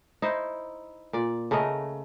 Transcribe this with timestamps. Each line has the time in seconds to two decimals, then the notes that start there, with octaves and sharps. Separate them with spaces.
0.22 D#4 E4 C5
1.13 A#2 D5
1.51 C#3 A3 A#4 D#5